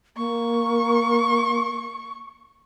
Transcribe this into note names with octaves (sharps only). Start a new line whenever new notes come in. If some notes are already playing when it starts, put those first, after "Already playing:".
A#3 C#6